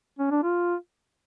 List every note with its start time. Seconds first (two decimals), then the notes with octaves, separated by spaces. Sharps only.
0.19 C#4
0.31 D4
0.43 F4